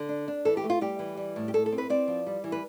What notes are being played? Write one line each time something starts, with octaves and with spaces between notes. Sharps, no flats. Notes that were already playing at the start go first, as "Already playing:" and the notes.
Already playing: D3
D4
D4
E3 A4
G4
A3
F4
G3 G4
E3
G3
A2
G4
A2 A4
A4
C4
B4
C4 D5
F3
G3
E3
B4